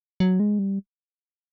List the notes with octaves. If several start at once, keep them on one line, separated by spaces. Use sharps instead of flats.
F#3
G#3
G3